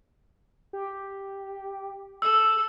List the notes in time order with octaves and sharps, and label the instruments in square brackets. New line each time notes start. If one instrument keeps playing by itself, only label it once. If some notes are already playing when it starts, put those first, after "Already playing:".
[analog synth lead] G4
[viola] A4 [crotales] E6